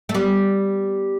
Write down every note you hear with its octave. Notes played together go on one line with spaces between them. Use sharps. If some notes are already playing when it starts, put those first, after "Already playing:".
A3
G3 B3